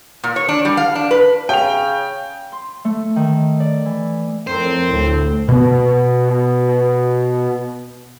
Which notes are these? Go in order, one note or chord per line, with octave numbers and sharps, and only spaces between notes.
A#2
C#5
D4
G3
F5
D4
B4
C#3 G5 F7
C6
A3
D#3
D5
E3
F2 A2 C4 A#4 C5
D2 A2
B2 B3